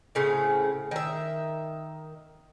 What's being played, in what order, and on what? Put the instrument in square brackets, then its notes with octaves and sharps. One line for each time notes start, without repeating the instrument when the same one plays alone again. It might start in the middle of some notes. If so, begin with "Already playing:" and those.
[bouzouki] A2 C#3 C4
D#3 E5